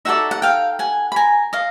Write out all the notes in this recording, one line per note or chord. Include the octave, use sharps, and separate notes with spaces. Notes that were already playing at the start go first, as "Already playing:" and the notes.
D#4 F#4 A4 D5 E5 F#5
F#5
F5 G5
F#5 G#5
B5
G#5 A#5
D#5 F5